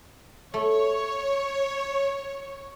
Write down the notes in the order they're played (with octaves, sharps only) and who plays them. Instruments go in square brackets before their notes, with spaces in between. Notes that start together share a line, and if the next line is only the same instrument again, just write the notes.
[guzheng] A3 [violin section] C#5